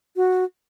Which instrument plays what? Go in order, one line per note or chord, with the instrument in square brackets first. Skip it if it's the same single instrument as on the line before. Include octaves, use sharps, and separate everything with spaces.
[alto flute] F#4